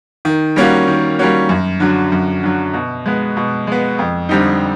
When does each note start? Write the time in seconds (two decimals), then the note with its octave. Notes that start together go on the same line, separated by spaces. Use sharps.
0.25 D#3
0.56 G3 A#3 C#4 F#4
0.87 D#3
1.19 G3 A#3 C#4 F#4
1.49 F#2
1.80 D3 F#3
2.12 F#2
2.43 D3 F#3
2.74 B2
3.06 G#3 B3
3.37 B2
3.67 G#3 B3
3.99 F2
4.29 D3 G3 C4 D#4